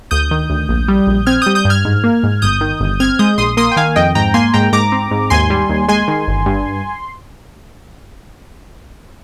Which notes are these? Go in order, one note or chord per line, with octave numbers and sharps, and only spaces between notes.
D2 D#6 G6
D#3
D2
A#1
G3
A#1
C4 F6 G#6
G3 D#6 G6
D#6 G6
G2
F6 G#6
G#2
A#3
G#2
G1 D#6 G6
D#3
G1
C4 F6 G#6
G#3 D#6 G6
A#1 C6 D#6
A#3 C6 D#6
G5
D#3 F5 G#5
F2 D#5 G5
G#2 G5 A#5
A#3 G#5 C6
G#2 G5 A#5
G#2 A#5 D6
C4
G#2
D#2 G#5 C6
G3
D#2
G#3 G#5 C6
D#3
G1
G2